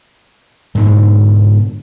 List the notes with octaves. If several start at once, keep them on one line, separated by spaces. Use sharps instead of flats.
G#2 B2 D3